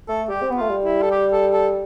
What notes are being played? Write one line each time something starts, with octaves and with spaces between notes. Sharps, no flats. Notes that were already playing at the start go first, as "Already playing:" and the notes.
A3 A4
G3 G4
C4
B3
F4
A3
G3
E4
A4
G4
A4
A4